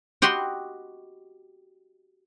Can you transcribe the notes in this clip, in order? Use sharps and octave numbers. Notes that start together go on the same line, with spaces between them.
F#4 G4 D#5 B5 C6